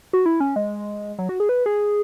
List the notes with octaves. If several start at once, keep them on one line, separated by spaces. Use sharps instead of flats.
F#4
E4
C#4
G#3
F#3
F#4
G#4
B4
G#4